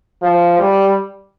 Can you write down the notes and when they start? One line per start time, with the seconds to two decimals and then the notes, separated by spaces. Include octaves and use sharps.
0.22 F3
0.59 G3